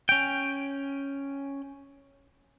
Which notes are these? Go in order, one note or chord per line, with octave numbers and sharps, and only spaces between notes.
C#4 G5